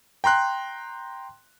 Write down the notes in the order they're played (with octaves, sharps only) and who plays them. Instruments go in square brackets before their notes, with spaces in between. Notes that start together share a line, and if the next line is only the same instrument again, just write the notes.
[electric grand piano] G5 A#5 C6 F#6